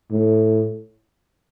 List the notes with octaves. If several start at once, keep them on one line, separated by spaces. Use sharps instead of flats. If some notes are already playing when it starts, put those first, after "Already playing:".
A2